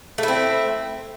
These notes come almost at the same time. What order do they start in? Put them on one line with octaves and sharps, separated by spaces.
A3 E4 C4